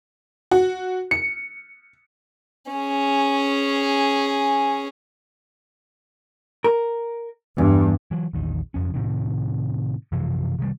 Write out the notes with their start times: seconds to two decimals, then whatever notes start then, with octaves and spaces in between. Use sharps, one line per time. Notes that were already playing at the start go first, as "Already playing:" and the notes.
0.51 F#4
1.11 C#7
2.72 C#4 G#4
6.64 A#4
7.58 E2 G2
8.11 E3 F#3
8.33 A#1 E2 D#3
8.74 F#1 F2 C#4
8.94 A2 C3 D#3
10.12 F#2 C3 E3 F3
10.59 C3 D#3 E3 G3